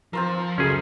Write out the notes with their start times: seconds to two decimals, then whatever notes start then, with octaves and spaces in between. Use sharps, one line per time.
0.13 F3 C4 F4 A#4
0.58 C#2 F#2 C#4 G#4 A4